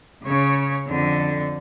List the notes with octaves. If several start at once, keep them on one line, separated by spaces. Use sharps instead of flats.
C#3 C#5
F2 D3